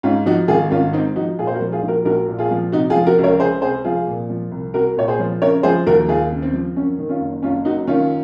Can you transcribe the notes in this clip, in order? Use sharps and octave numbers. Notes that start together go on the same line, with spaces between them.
G#2 C#4 F4
F3 D#4 F#4
G#1 F4 G#4
G#1 C#4 F4
G#2 C4 D#4
F3 D#4 F#4
A#2 F4 G#4
C5
F#4 A#4
F3
F4 G#4
A#1
F#4 A#4
A#1 F#4 A#4
A#2
F4 G#4
F3
C3 D#4 F#4
F4 G#4
F3
F#4 A#4
C#2
A#4 C#5
C#2 G#4 C5
C3 G#4 C5
F3 F4 G#4
A#2
F3
C2
C2 F#4 A#4
A#2 C#5
G#4 C5
F3
C#3 A#4 C#5
F3 G#4 C5
D#2 F#4 A#4
D#2 F4 G#4
C#3
C4
F3
F#2 C#4
D#3
C#4 F4
F#1
F#1 C#4 F4
F#2 D#4 F#4
D#3 C#4 F4